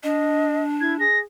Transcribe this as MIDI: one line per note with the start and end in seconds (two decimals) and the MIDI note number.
0.03 1.03 62
0.03 0.63 75
0.81 0.96 64
0.81 0.94 92
0.99 1.22 68
0.99 1.18 94